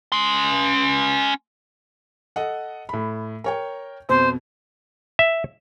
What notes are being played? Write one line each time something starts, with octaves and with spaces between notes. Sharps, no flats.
C#4 C6
A4 D#5 F#5
A2 B5
A#4 C#5 G5
F2 B2 C5
E5